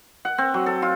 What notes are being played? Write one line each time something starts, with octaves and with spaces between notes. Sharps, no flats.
F#5
C4
F#3
A4
F4